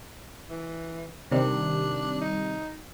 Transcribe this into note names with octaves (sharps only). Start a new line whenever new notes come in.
E3
C3 D#3 G3 D4
D#4